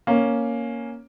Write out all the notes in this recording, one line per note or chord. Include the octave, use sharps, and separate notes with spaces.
A#3 C#4